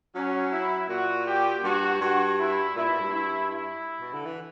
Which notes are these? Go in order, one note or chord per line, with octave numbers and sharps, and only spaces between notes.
F#3 C#4
E4
A#2 F#4
G4
G2 F#4
G2 F#4
E4
A#2 E4
B2
G2
E4
E4
B2
D3
E3